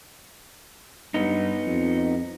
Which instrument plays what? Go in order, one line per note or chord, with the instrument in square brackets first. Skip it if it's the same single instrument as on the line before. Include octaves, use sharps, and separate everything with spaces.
[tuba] G2 [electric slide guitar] B3 D#4
[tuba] F2